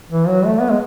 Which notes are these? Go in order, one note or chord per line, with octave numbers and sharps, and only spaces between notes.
E3
F#3
A3
B3
G#3